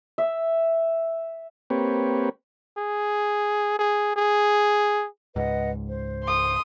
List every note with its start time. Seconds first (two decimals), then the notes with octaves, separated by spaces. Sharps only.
0.18 E5
1.70 A#3 C4 G4 B4 C#5
2.77 G#4
3.79 G#4
4.16 G#4
5.36 C#2 G#2 B4 D#5 F#5
5.87 C5
6.24 C6 D#6